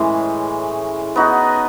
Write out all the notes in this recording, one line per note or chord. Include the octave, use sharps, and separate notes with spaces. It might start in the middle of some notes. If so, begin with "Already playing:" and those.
Already playing: A2 E3 G#3 C#4
B3 D#4 F#4